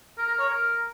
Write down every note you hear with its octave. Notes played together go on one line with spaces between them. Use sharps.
A#4
A#4
C#5
A#4